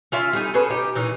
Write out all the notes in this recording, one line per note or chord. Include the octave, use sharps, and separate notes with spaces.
C#4 F4 E5
G3 A3 D#4 G#5
C#4 G#4 A4 B4
D#4 G4
A#2 E3 C#4 D#4